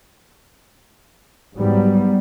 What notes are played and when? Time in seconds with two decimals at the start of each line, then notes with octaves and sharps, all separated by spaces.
1.56 G#2 F#3 G3 B3